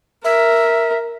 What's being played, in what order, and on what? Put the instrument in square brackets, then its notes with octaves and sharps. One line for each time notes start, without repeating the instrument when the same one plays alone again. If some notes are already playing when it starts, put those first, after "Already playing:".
[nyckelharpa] A#4 [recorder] E5